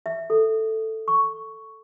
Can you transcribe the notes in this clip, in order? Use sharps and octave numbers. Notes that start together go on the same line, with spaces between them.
E5
A4
C#6